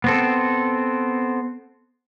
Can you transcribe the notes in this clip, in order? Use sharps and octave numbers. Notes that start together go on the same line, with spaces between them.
B3 C4 A4